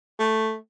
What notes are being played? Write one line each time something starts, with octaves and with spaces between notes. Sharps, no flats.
A3